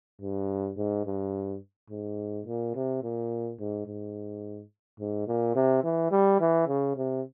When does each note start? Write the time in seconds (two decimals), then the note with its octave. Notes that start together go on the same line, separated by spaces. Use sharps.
0.21 G2
0.78 G#2
1.06 G2
1.90 G#2
2.46 A#2
2.75 C3
3.03 A#2
3.60 G#2
3.86 G#2
5.00 G#2
5.27 A#2
5.55 C3
5.84 E3
6.11 G3
6.41 E3
6.68 C#3
6.96 C3